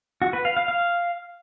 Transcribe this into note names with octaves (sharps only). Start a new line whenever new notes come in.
F#4
B4
F5
F5
F5